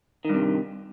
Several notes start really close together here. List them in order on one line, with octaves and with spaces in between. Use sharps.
D#3 G2 C3